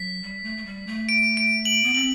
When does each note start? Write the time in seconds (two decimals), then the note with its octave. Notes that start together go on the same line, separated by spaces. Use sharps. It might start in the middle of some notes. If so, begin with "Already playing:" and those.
Already playing: F#3 B6
0.23 G3
0.44 A3
0.57 A3
0.66 G3
0.87 A3
1.09 D7
1.37 D7
1.65 F#7
1.84 B3
1.95 C4 F#7